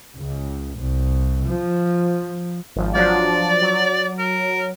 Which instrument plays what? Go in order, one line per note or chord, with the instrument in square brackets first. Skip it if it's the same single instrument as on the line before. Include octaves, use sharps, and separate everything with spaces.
[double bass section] C#2
C2
F3
[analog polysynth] G#1 F3
[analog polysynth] F3 F#3 D4 [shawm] D5
[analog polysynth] F#3
[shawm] A#4